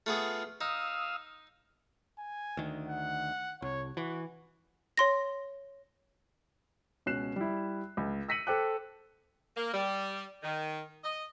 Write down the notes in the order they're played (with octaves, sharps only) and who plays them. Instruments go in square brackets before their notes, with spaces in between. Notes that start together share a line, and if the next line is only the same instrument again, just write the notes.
[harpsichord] A3 B3 G#4 [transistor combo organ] F4
[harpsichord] D#4 [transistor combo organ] F5 D#6 E6
[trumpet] G#5
[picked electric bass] D2 D#3
[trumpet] F#5
[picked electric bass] C2 [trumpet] C#5
[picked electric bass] E3 [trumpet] F#4
[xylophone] C#5 C6 A#6
[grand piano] C#2 B2 C#4 F#6 C7 E7
G3 E4
C#2
E6 A#6 B6 C#7 D#7 F#7
A4 C5 G5 D6 F#6
[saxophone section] A#3
G3
D#3
D#5